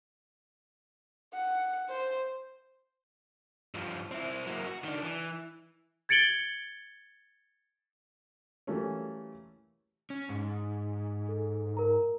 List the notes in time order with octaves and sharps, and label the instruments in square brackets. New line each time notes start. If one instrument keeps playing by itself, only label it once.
[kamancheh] F#5
C5
[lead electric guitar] G2 F3
C4 E4
F#3 A#3
F#4
D#3 D4
E3
[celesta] G#6 A6 C#7 D7 F#7 G7
[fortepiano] E3 F#3 G3 A3 A#3 C#4
[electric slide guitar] C#4
G#2
[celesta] A4
A#4 A#5